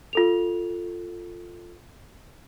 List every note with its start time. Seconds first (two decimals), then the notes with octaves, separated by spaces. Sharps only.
0.13 F4 A4 F7